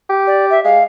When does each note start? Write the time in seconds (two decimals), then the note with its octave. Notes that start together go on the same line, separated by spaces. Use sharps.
0.09 G4
0.27 D5
0.50 E5
0.64 G#3 F5